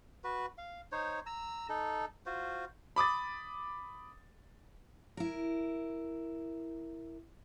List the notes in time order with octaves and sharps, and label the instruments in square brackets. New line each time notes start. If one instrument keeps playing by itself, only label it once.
[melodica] F#4 B4
F5
D#4 C5 C#5
A#5 E6
D#4 A4
F4 F#4 C5
[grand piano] B5 D6 D#6 A6
[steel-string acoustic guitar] E4 A#4